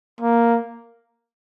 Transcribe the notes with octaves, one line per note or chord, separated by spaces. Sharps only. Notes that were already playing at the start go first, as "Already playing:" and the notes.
A#3